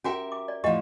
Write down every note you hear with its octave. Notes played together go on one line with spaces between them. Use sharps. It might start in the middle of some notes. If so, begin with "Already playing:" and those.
C#4 F#4 G4 A#4 E5 G5
D6
D5
A2 F3 G4 D#5 F#5